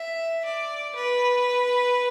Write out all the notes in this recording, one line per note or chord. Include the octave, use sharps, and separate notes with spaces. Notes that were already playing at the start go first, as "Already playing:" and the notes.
Already playing: E5
D5
B4